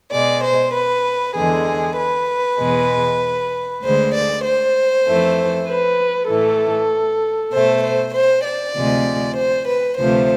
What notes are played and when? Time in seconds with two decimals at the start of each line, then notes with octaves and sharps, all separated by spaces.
0.12 B2 G#3 D5
0.44 C5
0.75 B4
1.36 E2 D3 G#3 G#4
1.98 B4
2.59 E2 B2 G#3
3.83 D2 D3 G#3 C5
4.14 D5
4.45 C5
5.06 F2 E3 A3
5.67 B4
6.29 A2 E3 A3 A4
7.52 B2 A3 C5
7.83 C5
8.14 C5
8.45 D5
8.76 D2 C3 F3 G#3
9.37 C5
9.68 B4
9.98 D2 C3 F3 A3 C5